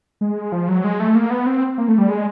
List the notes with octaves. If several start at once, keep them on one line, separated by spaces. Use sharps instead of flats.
G#3
F3
F#3
G#3
A3
A#3
B3
C4
A#3
A3
G3
G#3